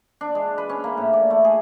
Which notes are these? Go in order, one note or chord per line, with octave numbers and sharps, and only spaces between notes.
D4
G#3
B4
C#4
A#3
A2
D5
A3
G#4